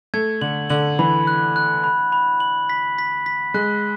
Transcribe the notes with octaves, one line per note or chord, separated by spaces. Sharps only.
A3 G#6
D3 F#7
D3 F#7
E3 B5
F#6
F#6
B5
B5
F#7
B6
B6
B6
G#3 F#6